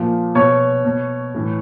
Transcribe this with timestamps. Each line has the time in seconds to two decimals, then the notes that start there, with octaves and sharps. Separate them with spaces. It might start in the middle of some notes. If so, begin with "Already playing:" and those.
Already playing: A#2 F3
0.35 B2 C#5 C#6
0.85 B2
1.34 A2 E3